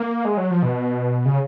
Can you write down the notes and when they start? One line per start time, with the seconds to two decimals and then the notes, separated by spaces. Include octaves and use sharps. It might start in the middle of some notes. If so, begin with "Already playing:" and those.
Already playing: A#3
0.25 G#3
0.37 F#3
0.51 F3
0.63 B2
1.26 C#3